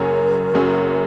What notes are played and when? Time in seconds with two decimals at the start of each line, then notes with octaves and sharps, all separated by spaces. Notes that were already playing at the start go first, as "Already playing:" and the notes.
Already playing: F#1 F#2 F#3 C#4 G#4 A#4
0.54 F#1 F#2 F#3 C#4 G#4